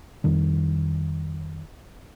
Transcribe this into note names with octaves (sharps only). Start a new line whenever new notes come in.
F2 D#3 G3